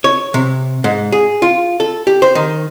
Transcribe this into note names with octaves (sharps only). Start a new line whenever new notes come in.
C#5
C3
G#2
G#4
F4
A4
G4
C5
D#3